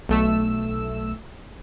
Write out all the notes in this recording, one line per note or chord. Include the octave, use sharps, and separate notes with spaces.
B1 A3 E6